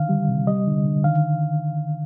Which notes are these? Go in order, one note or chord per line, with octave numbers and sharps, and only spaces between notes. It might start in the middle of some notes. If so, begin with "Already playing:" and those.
Already playing: D3 D#3 F5
G3
C3
G3 D#5
D3
D3
D#3 F5